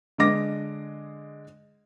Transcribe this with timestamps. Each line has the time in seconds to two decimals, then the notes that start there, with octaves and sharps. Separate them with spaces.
0.18 D3 G#3 D#5 D6 A#6